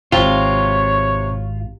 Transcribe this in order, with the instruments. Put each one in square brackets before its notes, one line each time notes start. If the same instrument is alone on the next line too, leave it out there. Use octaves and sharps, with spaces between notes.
[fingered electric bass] D#1 G#1 [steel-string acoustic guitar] C3 [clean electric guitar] F4 [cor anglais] C#5